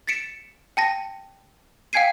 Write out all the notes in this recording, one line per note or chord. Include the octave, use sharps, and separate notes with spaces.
A6 B6 C#7 D7 E7
G5 A5 A#6
F5 G5 G#5 G#6 C7 D#7